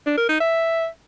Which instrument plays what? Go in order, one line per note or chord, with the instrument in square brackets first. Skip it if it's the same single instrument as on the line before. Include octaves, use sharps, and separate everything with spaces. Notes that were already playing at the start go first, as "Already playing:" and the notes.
[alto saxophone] D4
A#4
D#4
E5